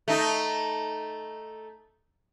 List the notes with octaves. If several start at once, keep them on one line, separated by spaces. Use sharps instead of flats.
A3 D#4